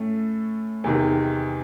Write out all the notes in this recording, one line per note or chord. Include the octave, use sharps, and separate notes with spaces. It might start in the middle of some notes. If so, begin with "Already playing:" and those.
Already playing: A2 A3 C#4
E2 C3 D#3